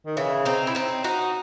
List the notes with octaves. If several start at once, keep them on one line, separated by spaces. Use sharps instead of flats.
D#3
C#3 E3
C4 D#4
E4
C4 D#4
D#4 F#4